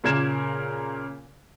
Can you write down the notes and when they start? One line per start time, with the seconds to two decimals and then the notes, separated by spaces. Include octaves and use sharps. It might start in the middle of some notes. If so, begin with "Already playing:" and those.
0.04 A#2 C#3 A#3 A#4 G#6 E7